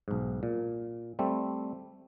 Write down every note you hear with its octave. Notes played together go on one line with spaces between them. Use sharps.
B1 G#2
A#2
G3 A3 C4